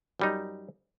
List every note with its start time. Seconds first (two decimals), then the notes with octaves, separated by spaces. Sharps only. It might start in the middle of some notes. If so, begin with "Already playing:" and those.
0.20 F#2 G3 D#4